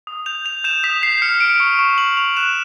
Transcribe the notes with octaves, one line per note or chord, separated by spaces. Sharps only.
D#6
G6 F7
G6 F7
G6 E7
D#6 B6
G6 C7
F6 C#7
F6 D7
C#6 D7
C#6 E7
F6 F#7
C#6 F7
F#6 E7